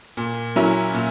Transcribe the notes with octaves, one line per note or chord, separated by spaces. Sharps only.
A#2
F#3 C#4 E4 A#4
A#2